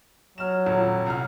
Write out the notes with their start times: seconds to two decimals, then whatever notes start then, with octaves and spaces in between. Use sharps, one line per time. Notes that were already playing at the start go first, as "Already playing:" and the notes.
0.38 F#3 F6 E7
0.66 D#1
1.06 C2 A#5 F6